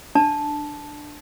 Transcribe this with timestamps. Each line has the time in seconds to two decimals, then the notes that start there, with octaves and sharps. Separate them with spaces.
0.15 D4 A5